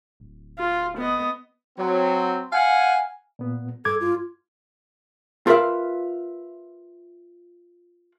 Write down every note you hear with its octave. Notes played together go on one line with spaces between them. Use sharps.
D1
F4
B3 D#5
F#3 C4
F5 F#5 G#5
A#2 B3
G2 A4 D6 G#6
F4
F4 A#4 B4 D5 E5 F5